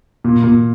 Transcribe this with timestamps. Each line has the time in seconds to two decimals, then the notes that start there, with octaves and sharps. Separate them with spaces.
0.24 A#2
0.44 A#2